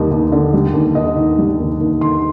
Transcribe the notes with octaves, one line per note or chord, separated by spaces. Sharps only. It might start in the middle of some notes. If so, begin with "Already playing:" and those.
Already playing: D#2 D3 G3 D#5
D#2
D3
G3
D#2
D#2 D#5
D#3
G3
D#2
D#2
D#3 C6